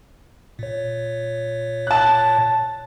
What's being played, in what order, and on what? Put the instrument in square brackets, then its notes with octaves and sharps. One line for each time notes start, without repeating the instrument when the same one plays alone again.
[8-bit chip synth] A#2 C#5
[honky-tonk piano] A5 F#6